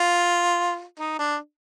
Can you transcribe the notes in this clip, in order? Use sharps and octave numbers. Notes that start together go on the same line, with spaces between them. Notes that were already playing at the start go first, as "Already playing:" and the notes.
Already playing: F4
D#4
D4